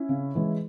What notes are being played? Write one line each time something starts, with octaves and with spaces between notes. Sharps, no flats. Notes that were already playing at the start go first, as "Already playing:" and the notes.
Already playing: C#4 E4
C#3
E3 G#3